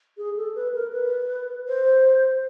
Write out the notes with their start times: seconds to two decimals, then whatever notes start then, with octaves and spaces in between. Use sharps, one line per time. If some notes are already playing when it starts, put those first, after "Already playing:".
0.18 G#4
0.36 A4
0.55 B4
0.74 A#4
0.93 B4
1.68 C5